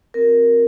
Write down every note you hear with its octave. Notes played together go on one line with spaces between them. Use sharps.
C4 F#4 A#4